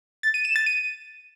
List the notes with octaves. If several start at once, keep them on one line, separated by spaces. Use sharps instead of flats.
A6
D#7
E7
A6
D#7